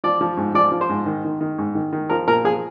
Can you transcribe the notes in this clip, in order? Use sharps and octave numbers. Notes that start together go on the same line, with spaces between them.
F3 D5
F3
G#2
F3 D5
F3
C5
G#2
D#3
D#3
D#3
G#2
D#3
D#3
F3 A#4
A#2 A#4
F3 G#4